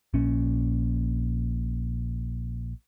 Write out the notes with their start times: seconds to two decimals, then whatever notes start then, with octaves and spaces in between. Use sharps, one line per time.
0.14 A#1 A#2 C#4